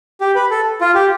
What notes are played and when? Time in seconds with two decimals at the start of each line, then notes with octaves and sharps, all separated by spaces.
0.21 G4
0.35 B4
0.51 A4
0.81 F4
0.95 G4